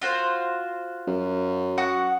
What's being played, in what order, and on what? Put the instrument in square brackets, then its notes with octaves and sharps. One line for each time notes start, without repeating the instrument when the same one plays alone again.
[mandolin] F4 F#4 C5
[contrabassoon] F#2
[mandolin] F#4 F#5 D#6